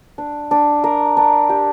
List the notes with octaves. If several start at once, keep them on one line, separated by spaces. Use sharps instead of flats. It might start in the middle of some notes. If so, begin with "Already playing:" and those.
D4
D4
A#4
D4
G4